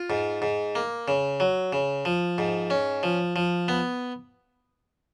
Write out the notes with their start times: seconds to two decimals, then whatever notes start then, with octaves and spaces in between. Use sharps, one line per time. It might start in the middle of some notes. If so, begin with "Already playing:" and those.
Already playing: F4
0.10 G#2
0.42 G#2
0.75 A#3
1.08 C#3
1.40 F#3
1.73 C#3
2.05 F3
2.38 G#2
2.70 C#4
3.03 F3
3.36 F3
3.68 B3